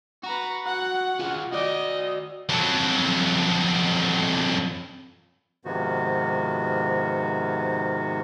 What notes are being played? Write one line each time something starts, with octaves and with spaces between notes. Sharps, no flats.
F#4 B4 A#5
F#5
F4 G#4
F#4 D5 D#5
F2 F#3
G#2 C3 D#3 F3 B3 F#4